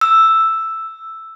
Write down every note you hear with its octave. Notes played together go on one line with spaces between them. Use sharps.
E6